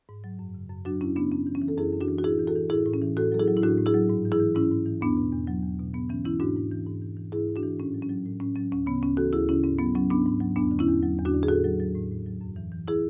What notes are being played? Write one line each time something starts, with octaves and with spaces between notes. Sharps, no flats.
G#2
F#3
F#2
C#3
F#2
F#3 D4 F#4
F#2 C#4 E4
C#3 B3 D4
F#2 C#4
E3
C#4
E3
A4
F#2 E4 G#4
F#2
D4 F#4
E3
F#4
A2 E4 G#4
E3
F#4 A4
E3
A2 E4 G#4
A2
C#4
E3
A2 F#4 A4
F#3 A4
E4 G#4
F#3
E4
A2 D4 F#4
A2
E4 G#4
F#3
G#2
E3
E4 G#4
E3
G#2 C#4 E4
G#2
E3
E2 B3 D4
B2
E2
F#3
E2
B2
G#2 B3
E3 C#4
E3 C#4 E4
G#2 D4 F#4
G#2
E3
G#2
E3
E3
G#2 E4 G#4
G#2
D4 F#4
E3
A2 C#4
F#3
C#4
F#3
A2
A2 C#4
F#3 C#4
D2 C#4
C#3 B3
D2 C#4
E3 F#4 A4
D2 E4 G#4
C#3 C#4 E4
G#2 C#4
F#3 B3
F#3 C#4
G#2 B3 D4
G#2
F#3
E2 B3 D4
D3
C#4 E4
E2
F#3
E2
D4 F#4
D3
G#4
A2 F#4 A4
F#3
F#3
A2
A2
F#3
F#2
E3
E3
E4 G#4